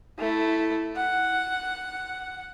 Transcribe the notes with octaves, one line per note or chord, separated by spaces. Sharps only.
A3 E4
F#5